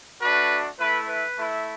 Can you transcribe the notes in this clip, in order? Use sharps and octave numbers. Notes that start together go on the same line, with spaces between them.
A3 D4 F#4 B4
A3 E4 B4
B4
A3 E4